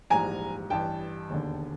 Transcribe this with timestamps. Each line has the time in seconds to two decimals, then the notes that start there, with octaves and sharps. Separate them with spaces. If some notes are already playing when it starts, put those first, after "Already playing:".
0.10 A#1 G#2 E3 G3 G#5 A#5
0.70 A1 G2 E3 G3 G5 A5
1.30 E1 D#2 D3